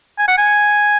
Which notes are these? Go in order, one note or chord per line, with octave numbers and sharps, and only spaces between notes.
G#5
F#5
G#5